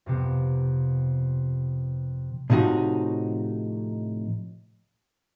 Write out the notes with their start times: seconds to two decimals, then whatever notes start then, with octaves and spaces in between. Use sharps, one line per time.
0.06 F2 C3 B3
2.50 A2 C3 F3 D#4 F#4